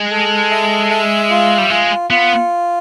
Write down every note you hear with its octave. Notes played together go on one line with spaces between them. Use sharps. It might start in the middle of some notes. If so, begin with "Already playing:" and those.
Already playing: G#3
A4
E5
E5
F4
G3
G#3 F4
B3 F4